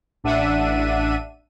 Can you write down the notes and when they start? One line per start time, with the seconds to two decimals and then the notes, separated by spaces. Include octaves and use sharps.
0.24 A1 D4 E5 F#5 D#7